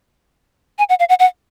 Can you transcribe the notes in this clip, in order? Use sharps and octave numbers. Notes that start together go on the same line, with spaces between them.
G#5
F#5
F5
F#5
F#5